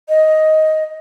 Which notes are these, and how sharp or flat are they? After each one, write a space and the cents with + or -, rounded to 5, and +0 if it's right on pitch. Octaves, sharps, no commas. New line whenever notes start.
D#5 +10